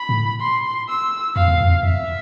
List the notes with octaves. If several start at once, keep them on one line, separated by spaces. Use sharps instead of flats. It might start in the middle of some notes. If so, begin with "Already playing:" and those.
Already playing: B5
A2
C6
E6
F2 F5
E2
F2
F2 E5